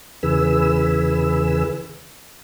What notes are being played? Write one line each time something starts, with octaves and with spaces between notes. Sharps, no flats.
E2 C#3 E3 G#4 B4 E6